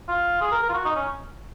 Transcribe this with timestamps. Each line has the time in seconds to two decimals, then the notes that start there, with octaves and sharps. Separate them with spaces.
0.08 F4
0.41 G#4
0.52 A#4
0.62 A#4
0.69 F4
0.73 F#4
0.85 D#4
0.96 C#4